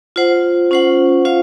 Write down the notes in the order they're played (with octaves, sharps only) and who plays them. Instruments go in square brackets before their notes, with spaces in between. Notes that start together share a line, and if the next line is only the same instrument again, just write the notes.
[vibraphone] F4 C5 F#5
C#4 F4 C5 F#5
F4 C5 F5